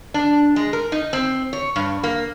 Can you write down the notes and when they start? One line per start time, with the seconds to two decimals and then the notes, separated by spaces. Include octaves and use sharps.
0.14 D4
0.56 G#3
0.73 A#4
0.92 D#4
1.13 C4
1.53 C#5
1.76 G2
2.03 A#3